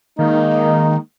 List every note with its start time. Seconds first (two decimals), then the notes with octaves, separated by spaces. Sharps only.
0.19 D#3 G#3 A#3 D#4